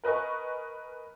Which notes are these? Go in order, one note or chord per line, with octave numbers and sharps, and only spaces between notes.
A#4 B4 D#5 G#5 C#6